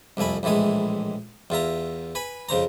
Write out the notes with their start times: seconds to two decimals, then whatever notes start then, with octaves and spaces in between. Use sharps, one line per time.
0.17 C2 F2 A3 G#5 B5
0.43 A#1 A2 E3 G#3 G#5
1.50 E2 F4 E5 A#5
2.15 B4 G#5 B5
2.49 F2 C#3 C5 A#5